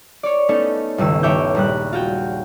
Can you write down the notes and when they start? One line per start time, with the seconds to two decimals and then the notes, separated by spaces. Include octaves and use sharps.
0.23 C#5 D5
0.49 A3 B3 C#4 D#4 A4
0.98 G1 C#2 D#3 E6
1.23 G1 D#2 C#5 E5 D6 G6
1.55 A#1 G3 F#6
1.93 F4 F#4 G5